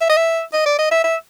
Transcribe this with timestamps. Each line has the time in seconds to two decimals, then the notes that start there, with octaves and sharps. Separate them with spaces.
0.01 E5
0.10 D#5
0.17 E5
0.54 D#5
0.66 D5
0.79 D#5
0.91 E5
1.04 E5